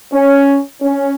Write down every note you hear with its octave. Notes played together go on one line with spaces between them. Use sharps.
C#4
C#4